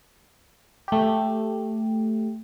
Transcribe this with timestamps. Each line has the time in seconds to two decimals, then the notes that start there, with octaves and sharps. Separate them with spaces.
0.88 A3 G4